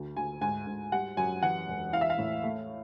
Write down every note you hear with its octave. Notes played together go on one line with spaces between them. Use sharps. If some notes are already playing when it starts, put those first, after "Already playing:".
Already playing: D2
D2 G#5
G#2 G#5
G#2
G3 F#5
F#2 G#5
E3 F#5
E1
E4 F5
E5
F5
A2
A3